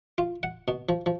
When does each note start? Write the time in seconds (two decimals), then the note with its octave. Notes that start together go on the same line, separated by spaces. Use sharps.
0.18 F4
0.43 F#5
0.68 B2
0.89 F3
1.06 F3